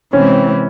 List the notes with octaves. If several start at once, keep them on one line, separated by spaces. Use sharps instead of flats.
C3 E3 G#3 C4 C#4